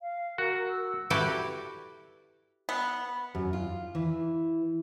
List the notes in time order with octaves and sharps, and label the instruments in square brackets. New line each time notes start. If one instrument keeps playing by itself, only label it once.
[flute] F5
[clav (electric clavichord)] F#4 [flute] A#4
[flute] E6
[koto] E4 F#4 G4 A4 B4 D5
[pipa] B3
[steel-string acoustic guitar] F#2
F4
E3